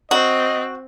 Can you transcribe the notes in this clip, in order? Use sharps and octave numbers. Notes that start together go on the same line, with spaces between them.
C4 F#4 D#5